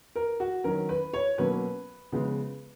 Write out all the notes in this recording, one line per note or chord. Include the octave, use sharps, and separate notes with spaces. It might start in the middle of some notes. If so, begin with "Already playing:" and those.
A#4
F#4
D#3 F#3 C#4 A#4
B4
C#5
B2 F#3 A#3 C#4 B4
C#3 F3 G#3 B3